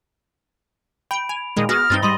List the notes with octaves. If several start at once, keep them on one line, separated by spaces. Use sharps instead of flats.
G5 B5 D7
G#5 F7
A#2 D#3 G#3 D#5
B3 F#4 G#4 D#6 F6 A#6
G2 C4 D#4 A6 G7
G#2 G3 D#5 B5 C6